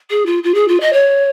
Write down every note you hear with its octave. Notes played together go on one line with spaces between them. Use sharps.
G#4
F4
F4
G#4
F4
D#5
C#5